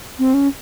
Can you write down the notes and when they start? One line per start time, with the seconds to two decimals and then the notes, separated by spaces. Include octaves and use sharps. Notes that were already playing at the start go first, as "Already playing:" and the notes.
0.19 C4
0.34 C#4